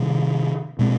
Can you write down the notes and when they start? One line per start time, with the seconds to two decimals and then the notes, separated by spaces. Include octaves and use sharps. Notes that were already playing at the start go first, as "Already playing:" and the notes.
Already playing: C3 D#3 G3
0.79 B2 G#3 C4